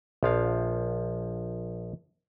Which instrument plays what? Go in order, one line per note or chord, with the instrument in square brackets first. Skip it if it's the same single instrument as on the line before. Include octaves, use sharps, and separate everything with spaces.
[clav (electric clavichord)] A#1 F3 F5